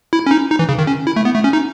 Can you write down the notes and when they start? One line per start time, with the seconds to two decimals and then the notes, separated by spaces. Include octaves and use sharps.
0.13 E4
0.26 C#4
0.31 D#4
0.50 D#4
0.59 E3
0.69 C#3
0.78 D#3
0.87 C#4
1.07 E4
1.16 A3
1.25 B3
1.35 A3
1.44 C#4
1.53 D#4